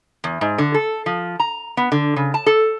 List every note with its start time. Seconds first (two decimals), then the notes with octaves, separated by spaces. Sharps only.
0.24 E2
0.41 G#2
0.58 D3
0.74 A4
1.06 F3
1.40 A#5
1.77 B3
1.92 D3
2.16 C#3
2.34 A5
2.46 A4